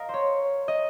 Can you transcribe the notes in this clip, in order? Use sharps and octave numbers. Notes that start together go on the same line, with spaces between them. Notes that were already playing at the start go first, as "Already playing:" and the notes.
Already playing: A#4 D#5 F5
C5 C#5
D#5